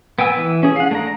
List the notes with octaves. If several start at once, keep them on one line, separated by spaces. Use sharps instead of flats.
B3 G5 G#5 E6
E3
C#4 G#4
F5 F#5
A3 D4 A#5